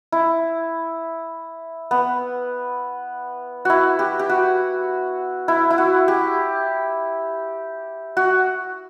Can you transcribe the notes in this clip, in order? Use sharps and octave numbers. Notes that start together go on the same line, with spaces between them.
E4
B3
E4 F#4
G4
G4
F#4
E4
E4
F#4
G4
F#4